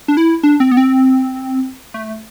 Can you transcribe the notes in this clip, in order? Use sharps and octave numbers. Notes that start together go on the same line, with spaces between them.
D4
E4
D4
C4
B3
C4
A3